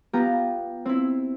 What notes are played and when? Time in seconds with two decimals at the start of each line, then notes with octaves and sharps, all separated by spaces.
0.13 B3 F4 G4 A#5
0.85 C4 E4